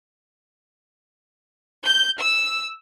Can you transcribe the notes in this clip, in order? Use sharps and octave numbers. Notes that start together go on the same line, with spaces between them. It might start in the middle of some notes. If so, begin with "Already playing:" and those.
G6
E6